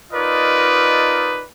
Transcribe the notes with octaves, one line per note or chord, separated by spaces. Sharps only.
D#4 F4 A#4 B4 D5 D#5